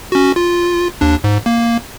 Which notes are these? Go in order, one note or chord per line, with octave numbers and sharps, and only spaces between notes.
C#4 F#4
F4
D#2 D4
G#2
A#3